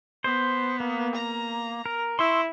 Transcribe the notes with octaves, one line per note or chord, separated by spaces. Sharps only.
B3 C5
A#3
A#5
A#4
E4 C6 C#6 E6